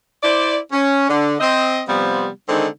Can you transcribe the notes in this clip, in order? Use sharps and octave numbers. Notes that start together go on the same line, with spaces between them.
E4 C5 D5
C#4
D3
C4 D#5
C3 F3 G3 B3
D3 D#3 G#3 C4 D#4